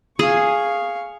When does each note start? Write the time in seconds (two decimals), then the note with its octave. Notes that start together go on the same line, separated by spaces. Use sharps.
0.19 G#4 F5 C#6